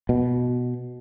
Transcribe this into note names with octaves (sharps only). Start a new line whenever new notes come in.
B2